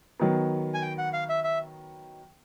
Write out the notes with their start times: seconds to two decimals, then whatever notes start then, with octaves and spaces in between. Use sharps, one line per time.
0.20 D#3 F#3 B3
0.74 G#5
0.82 G5
0.98 F#5
1.13 F5
1.29 E5
1.44 E5